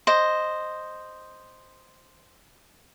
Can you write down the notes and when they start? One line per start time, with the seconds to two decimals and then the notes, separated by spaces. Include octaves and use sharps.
0.07 C5 D#5